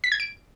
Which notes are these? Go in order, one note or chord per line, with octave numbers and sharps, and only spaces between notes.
B6
G#6
D7